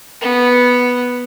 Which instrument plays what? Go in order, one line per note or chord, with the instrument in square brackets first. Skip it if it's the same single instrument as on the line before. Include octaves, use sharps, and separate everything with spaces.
[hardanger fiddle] B3